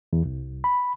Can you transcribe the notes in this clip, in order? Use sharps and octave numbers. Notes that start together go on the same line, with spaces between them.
E2
C2
B5